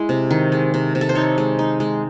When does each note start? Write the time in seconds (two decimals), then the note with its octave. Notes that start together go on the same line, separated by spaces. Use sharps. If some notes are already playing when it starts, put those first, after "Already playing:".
Already playing: G#3 E4
0.09 C3
0.31 D#3
0.52 G#3
0.74 C3
0.95 C3
1.01 A4
1.09 C5
1.15 D#4 C#5
1.38 G#3
1.59 D#4
1.80 G#3